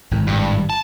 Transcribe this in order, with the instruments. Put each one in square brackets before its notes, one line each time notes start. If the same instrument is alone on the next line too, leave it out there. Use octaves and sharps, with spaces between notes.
[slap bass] G#1 A2 C3
[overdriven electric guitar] G2
A5